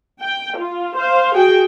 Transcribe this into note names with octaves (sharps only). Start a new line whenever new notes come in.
G5
F4
C5 F5
F#4 G#4 G5